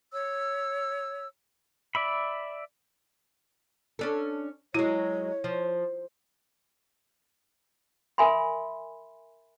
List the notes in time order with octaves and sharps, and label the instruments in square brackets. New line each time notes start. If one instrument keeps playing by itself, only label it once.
[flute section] C#5 E6
[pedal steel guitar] D5 E5 B5
[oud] C#4 D4 A4
[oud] F#3 G#3 [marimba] E4 [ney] C#5
[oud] F3
[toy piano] A#4 E5 G#5 B5 C6